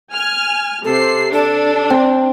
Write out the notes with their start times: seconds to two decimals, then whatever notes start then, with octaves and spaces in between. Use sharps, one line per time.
0.14 G#5 F6
0.84 C3 A4 C7
1.33 D4 A4
1.90 C4